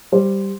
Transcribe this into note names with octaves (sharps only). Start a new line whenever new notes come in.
G3 C5